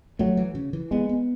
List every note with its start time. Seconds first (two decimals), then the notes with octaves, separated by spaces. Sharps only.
0.19 F#3 A3
0.37 E3
0.55 C#3
0.73 E3
0.91 G#3 B3
1.09 B3